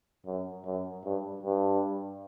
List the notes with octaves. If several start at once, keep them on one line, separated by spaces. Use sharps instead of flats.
F#2
F#2
G2
G2